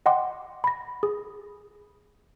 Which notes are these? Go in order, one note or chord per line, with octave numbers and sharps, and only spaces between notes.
D#5 F#5 G5 C6 D6
B5 A#6
G#4